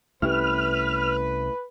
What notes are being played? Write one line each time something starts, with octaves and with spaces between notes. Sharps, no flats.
C2 A3 C#4 E4 G4 B4 F6